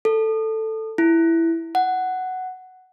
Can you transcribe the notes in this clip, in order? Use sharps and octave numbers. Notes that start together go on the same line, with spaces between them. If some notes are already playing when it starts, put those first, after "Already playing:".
A4
E4
F#5